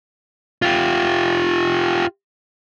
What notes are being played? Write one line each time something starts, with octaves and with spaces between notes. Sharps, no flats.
F4 G4